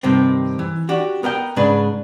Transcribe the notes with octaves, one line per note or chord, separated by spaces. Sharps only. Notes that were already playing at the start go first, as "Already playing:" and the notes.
G2 C3 D#3 C4
E3
D4 F#4 G4
B3 A#4 E5 G5
G#2 C#3 D4 B4